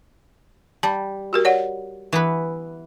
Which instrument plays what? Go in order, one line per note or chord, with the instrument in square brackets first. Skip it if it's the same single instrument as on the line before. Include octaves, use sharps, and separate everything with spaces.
[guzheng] G3 [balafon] A5
[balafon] F#4 G4 A#4
C#5 D5 F#5
[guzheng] E3 B3 B4